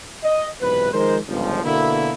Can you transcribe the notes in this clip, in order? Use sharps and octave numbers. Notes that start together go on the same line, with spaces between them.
D#5
B1 E2 G#2 C3 B4
D#3 F3 G#3 A#4 C5
G1 C#2 F3
B2 D3 A#3 E4